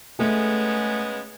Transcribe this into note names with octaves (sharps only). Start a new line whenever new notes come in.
C#3 G#3 A3 B3